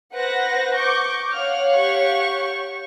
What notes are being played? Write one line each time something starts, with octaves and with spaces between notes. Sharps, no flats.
B4 C5 F#5 A#6
C#6 D6 G6
C#5 F5 F#5 F6
G4 C#6